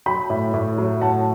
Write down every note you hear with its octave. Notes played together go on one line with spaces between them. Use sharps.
F#3 G5 B5
A2
A2
F#3
A2 F#5 A5